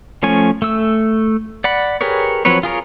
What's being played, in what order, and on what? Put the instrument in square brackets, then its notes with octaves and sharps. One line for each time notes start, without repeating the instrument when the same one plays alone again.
[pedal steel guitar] F3 A3 C#4 G#5
A3 E6
D5 F#5 B5
G4 G#4 A#4 B4 C#5
F3 F#3 C4 B4 C#5
F4 G#4 A#4 C#5